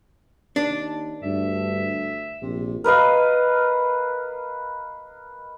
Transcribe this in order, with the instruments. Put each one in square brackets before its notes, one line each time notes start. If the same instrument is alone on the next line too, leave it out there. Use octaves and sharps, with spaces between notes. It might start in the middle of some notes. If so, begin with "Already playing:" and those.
[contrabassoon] D#2 [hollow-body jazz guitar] D4
[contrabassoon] D2 [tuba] G2 [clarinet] E5
[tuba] A#1 [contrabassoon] C3
[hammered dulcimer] A#4 B4 D#5 F5